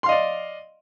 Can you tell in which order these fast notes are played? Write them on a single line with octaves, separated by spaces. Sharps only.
C6 F5 D#5 D5